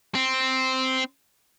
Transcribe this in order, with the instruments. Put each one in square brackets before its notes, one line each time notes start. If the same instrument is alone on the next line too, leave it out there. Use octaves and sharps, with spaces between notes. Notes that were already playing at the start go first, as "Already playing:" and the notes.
[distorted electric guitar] C4